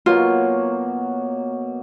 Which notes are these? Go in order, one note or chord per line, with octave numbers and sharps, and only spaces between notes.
B2 F#3 A#3 F4